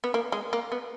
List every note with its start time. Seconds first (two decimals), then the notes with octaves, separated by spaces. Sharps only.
0.04 B3
0.14 A#3
0.32 G#3
0.53 A#3
0.72 B3